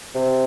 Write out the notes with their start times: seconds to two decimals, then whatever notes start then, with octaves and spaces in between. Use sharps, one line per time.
0.15 C3